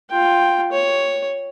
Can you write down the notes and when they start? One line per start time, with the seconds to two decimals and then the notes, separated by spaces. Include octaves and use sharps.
0.10 F4 G5
0.72 C#5